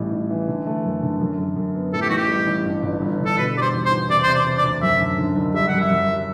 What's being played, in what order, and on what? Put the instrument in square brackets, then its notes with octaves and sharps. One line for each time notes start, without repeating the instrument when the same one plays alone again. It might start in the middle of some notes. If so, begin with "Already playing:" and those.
Already playing: [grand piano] A1 A2 G3
A1
E3
D3
A3
F#2
D3
F#2
F#2
F#2
B3
[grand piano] A2 [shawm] A4
[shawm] G4
[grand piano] A1 [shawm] F#4
[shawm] G4
[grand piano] G3
A1
G2
G1
G1
D3
[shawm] A4
[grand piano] B2 [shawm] B4
[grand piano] G3 [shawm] D5
[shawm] C5
[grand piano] E2
[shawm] C5
[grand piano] E2
[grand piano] C3 [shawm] D5
[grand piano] C3 [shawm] C5
[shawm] D5
[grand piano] C3
[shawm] D5
[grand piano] D2
[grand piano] F#2 [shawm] E5
[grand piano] D3
D3
F#1
[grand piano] G3 [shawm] E5
[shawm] F#5
[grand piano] F#2
[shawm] E5
[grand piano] F#2
G3